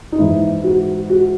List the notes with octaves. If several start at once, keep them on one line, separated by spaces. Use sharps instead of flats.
D#4
G#2 E3 E4
F#4
F#4